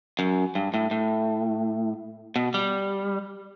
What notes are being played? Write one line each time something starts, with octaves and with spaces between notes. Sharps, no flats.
F#2
G2
A2
A2
B2
G3